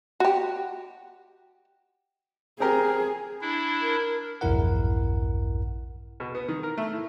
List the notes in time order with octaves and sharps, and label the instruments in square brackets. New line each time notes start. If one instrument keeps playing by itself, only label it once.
[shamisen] F#4 G4
[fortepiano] C4 G4 A#4 [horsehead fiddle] G#4
[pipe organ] D4 E4
[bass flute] A#4
[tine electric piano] A#1 E2 G2 E4 A#4 F#5
[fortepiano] B2
B3
D#3
A#4
A3
A2